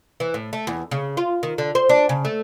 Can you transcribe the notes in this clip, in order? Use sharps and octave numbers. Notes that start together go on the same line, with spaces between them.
E3
A2
A3
E2
C#3
F4
D#3
D3
C5
D4
C#3
A3